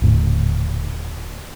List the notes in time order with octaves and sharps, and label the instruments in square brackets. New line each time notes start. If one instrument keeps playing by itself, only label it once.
[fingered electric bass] D#1 A2 D3